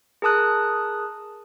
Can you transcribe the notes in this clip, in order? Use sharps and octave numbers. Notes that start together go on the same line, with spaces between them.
G#4 A#4 A5 D#6 F#6